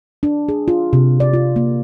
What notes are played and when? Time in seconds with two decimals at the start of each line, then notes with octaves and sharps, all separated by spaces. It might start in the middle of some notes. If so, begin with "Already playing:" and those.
0.23 D4
0.49 G#4
0.68 F4
0.93 C3
1.20 D5
1.33 F4
1.56 A#3